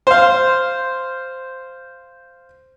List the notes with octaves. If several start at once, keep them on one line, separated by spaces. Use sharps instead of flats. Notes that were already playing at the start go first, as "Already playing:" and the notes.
C5 F5